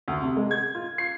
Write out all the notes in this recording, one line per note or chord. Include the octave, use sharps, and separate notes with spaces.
D2
C3
G#3
G#6
F4
C7